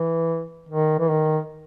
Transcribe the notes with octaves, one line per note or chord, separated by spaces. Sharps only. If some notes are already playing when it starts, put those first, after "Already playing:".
Already playing: E3
D#3
E3
D#3